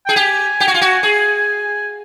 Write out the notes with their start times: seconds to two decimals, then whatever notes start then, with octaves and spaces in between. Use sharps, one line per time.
0.06 G#4 G5
0.16 G4 G#5
0.60 G4
0.68 F#4
0.74 F4
0.81 F#4
1.03 G#4